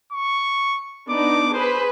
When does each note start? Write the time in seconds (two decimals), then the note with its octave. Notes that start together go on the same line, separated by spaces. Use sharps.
0.13 C#6
1.10 B3 D4 D#4 D6
1.53 G#4 B4 C5